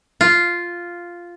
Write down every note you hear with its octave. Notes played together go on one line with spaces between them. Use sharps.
F4